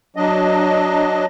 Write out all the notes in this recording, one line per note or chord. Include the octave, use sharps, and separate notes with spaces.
F#3 D4 D#5